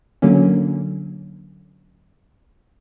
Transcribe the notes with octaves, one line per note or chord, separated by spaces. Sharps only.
D3 F#3 A#3 C#4